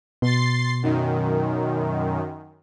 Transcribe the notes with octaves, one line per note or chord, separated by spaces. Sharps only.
B2 C6 A6 C7
F#2 D#3